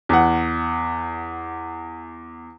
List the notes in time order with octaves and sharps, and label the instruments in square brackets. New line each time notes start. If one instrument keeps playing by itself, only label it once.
[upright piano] E2 F#5